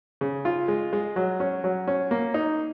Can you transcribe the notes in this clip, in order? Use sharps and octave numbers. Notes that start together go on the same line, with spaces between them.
C#3
F4
G#3
G#3
F#3
C#4
F#3
C#4
A#3
D#4